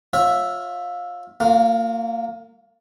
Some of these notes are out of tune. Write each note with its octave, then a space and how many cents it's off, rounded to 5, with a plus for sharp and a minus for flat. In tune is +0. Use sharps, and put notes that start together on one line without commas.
F4 +25 C#5 -20 E5 +0
A#3 -30 F4 +25